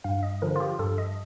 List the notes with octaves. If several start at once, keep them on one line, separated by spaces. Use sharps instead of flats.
G2 F5
D#5
D3 F3 A#4
F4
G4
G2 A4
D#5